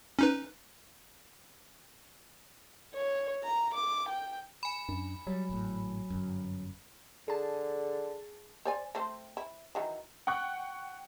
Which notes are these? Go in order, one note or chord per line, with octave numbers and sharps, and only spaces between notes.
C#4 D#4 B4
C#5
A#5
D6
G5
G#5 B5
F#2 D4
F#3 G3
G#1 A2
G1 F#2
D3 G#4 A5
C5 D5 G#5
A3 C4 C5
E4
D#3 E3 F#3
F#5 G5 C#6 F#6